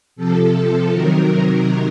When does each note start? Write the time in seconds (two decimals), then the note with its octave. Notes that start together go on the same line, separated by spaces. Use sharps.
0.16 C3 F3 A4
0.54 A4
0.90 C3 D#3 F#3 A#4